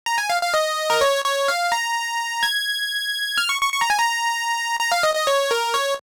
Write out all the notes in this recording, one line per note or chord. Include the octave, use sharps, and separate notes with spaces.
A#5
G#5
F5
F5
D#5
A#4
C#5
C#5
F5
A#5
G#6
F6
C#6
C#6
C#6
A#5
G#5
A#5
A#5
F5
D#5
D#5
C#5
A#4
C#5